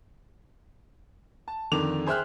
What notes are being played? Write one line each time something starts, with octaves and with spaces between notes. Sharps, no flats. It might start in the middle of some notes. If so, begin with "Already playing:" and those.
A5
F2 D3 D#3 D6 F7
G#4 C5 E5 G5 F6 F#6